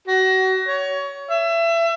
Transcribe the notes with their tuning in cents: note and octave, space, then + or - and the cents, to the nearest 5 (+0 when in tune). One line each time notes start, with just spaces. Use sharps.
F#4 +30
C#5 +25
E5 +30